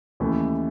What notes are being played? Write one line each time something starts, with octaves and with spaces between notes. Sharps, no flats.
D#2 C#3 E3 A3